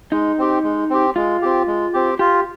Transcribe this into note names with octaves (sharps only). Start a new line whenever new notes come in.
G#3 D#4
C4 G4
G#3
C4 G4
G#3 F4
C4 G4
G#3
C4 G4
F4 G4